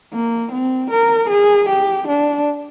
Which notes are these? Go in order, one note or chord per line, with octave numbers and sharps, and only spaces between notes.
A#3
C4
A#4
G#4
G4
D4